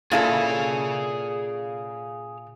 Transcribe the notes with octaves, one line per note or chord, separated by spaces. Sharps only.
A#2 E4 G#4 A4 F5